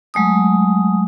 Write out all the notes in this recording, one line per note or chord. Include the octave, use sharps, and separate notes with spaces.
F#3 G#3 A3 D#6